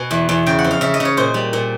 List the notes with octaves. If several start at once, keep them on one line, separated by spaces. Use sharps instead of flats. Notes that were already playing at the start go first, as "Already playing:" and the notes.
Already playing: B2 G#5
E2
E2
C#3 G5
F#5
F2
F5
C#3 E5
D#5
C#3
C#5
A#2 C5
G3
A#2